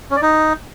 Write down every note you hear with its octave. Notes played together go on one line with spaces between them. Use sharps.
C#4
D5
D#4